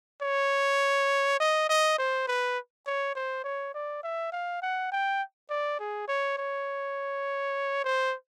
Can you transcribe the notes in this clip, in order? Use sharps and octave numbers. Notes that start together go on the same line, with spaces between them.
C#5
D#5
D#5
C5
B4
C#5
C5
C#5
D5
E5
F5
F#5
G5
D5
G#4
C#5
C#5
C5